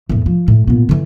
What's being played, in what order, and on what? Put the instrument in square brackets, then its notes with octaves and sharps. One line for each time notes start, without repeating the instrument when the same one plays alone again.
[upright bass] E2 A2
F3
A2
A#2 B3
D3 E3